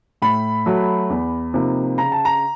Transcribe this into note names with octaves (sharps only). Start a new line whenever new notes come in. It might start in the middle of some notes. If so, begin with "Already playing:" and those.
A2 B5
F#3 A3
E2
C3 F3 A#3 D#4
C#3 A#5
A5
A#5